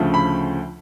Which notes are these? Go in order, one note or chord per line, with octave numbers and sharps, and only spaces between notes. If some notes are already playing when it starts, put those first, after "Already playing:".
Already playing: D2 C#3 F3 A3
B5